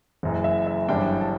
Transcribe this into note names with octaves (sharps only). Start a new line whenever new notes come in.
F#1 F#2 E3
E5
E5
G1 F#2 E3 G3 D4 G5
A5